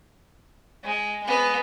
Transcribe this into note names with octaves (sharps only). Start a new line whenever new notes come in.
G#3
G#3 B3